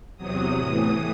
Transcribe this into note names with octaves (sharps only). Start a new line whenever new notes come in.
E2 C3 F#3 D#6
A2 E3